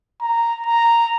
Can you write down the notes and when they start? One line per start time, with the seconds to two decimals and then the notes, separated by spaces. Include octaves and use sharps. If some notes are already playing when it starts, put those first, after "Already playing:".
0.21 A#5
0.66 A#5